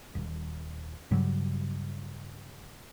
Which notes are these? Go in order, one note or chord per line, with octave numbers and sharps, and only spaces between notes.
D#1
G2 C#3 F#3 G3